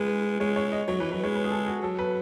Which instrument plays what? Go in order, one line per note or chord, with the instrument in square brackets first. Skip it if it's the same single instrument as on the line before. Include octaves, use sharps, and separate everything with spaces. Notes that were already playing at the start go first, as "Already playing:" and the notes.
Already playing: [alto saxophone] G#3 [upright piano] B4
[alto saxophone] G#3 [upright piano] C#5
[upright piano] C#5
D#5
[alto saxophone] F#3 [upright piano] C#5
[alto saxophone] E3 [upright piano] B4
[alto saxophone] F#3 [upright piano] B4
[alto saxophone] G#3 [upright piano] C#5
[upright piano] B4
G#4
A4
F#4
[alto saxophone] F#3 [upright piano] A4
[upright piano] B4